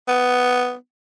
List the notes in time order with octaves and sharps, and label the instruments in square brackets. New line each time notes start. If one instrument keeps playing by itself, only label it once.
[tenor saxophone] B3